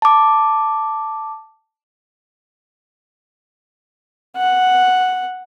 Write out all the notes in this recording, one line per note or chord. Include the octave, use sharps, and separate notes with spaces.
A5 D6
F#5